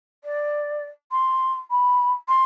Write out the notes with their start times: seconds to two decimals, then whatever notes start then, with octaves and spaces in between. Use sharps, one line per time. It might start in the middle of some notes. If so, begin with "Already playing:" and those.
0.24 D5
1.11 C6
1.70 B5
2.28 C6